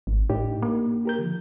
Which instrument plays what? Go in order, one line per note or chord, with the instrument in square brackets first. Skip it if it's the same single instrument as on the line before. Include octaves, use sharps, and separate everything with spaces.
[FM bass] G#1
[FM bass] A2 [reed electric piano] D4 D#4 G4
[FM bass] A#3
[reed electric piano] G4 A#4 G6
D3 D#3 F3